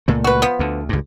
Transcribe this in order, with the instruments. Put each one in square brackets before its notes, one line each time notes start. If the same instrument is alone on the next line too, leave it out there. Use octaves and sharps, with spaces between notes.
[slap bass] C#2 A#2 A3
[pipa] F#4 B4
F3 B3
[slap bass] D2 D3
C#2 G2